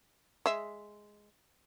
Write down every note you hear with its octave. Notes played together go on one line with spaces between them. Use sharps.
G#3 E5